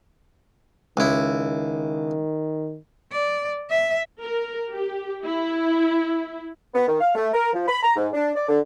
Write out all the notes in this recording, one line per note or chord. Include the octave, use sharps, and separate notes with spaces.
C#2 D#3 E4
D5
E5
A#4
G4
E4
B3
D#3
F5
A3
A#4
F3
B5
A#5
G#2
D4
D5
D3